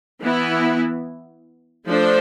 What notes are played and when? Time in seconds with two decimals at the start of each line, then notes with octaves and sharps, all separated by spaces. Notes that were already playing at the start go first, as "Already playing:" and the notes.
0.21 E3 B3 E4
1.86 F3 A3 D4 A4 C5